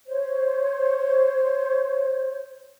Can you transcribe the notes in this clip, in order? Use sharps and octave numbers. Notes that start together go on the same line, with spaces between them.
C5 C#5